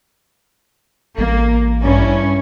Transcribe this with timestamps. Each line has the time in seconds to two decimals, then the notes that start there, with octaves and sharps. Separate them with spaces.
1.18 A1 A#3
1.81 G2 C#4 E4